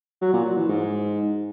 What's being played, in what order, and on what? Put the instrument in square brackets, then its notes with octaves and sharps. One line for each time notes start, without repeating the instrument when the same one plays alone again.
[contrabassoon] F#3
A#2
F#3
E3
G#2